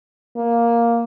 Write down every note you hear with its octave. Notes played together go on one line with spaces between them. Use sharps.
A#3